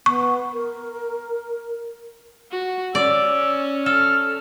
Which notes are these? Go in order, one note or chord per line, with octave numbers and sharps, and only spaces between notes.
B3 C#6
A#4
F#4
C#4 D5 E6
A4 F6